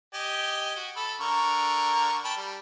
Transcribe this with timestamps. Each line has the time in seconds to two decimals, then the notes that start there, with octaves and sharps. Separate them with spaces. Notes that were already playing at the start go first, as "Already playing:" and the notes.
0.14 G4 D#5 G#5
0.76 F#4
0.96 A4 B5
1.21 D3 A#4 C#6
2.24 G5 A5 B5
2.37 G3